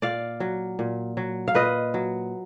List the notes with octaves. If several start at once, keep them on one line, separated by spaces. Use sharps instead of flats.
A#2 D5 F5
F#3
A#2
F#3
F5
A#2 B4 D#5
F#3